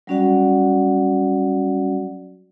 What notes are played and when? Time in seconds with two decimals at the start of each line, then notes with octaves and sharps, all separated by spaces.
0.07 F#3 G3 C#4 F#4 D5 F#5